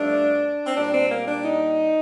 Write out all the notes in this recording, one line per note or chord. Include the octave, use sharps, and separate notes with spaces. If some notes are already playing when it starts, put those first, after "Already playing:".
Already playing: G2 F3 A3 D4
C4
A#2 G3 D4
C4
A#3
D4
D#4